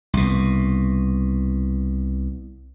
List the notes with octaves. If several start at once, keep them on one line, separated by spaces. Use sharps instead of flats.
C2 B2